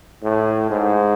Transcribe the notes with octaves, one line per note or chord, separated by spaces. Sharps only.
A2
G#2